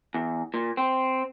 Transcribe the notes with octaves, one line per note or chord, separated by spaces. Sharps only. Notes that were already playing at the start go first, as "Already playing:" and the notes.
E2
A#2
C4